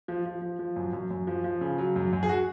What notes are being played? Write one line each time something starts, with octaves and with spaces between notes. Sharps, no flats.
F3
F3
F3
F3
F#2
F#2
F#2
F3
F3
C#3
F#3
F#2
F#2
G#4
F#4